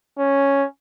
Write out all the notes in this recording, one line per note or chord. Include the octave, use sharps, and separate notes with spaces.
C#4